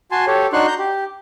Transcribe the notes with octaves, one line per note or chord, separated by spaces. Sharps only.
F#4 G#5 A5 C6
G4 A4 C#5
D4 D#4 F#4 C6 C#6 F#6
A#5 G6
G4